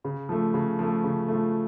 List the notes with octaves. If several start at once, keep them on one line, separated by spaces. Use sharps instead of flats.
C#3
F3 A3
C#3
F3 A3
C#3
F3 A3